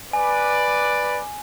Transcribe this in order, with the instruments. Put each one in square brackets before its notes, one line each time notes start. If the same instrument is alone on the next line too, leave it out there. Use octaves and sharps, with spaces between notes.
[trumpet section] B4 D5 [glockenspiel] G#5